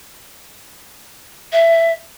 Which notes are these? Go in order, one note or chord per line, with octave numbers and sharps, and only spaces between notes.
E5